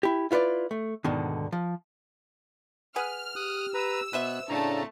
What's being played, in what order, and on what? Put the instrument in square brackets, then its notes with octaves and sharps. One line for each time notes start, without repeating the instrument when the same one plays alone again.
[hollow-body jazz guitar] E4 G4
E4 F4 B4 C#5 D5
A3
D2 G#2 B2 D3 D#3
F3
[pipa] G#4 B4 F#5 [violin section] F6
[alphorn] G4 [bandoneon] D#6 F#6
[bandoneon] B4 A#5 [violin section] E6
[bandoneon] B2 B3 F#6 [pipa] B4 C5 E5
[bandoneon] A2 C#3 A#5 [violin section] A3 C4 A5 [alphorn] D4